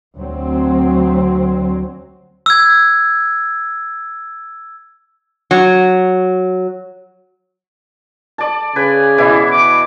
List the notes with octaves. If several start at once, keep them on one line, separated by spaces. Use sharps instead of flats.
D2 F#3 C4
E6 G#6
F#3
D5 A5
C#3 B4 G#5
B2 E3 E4
D6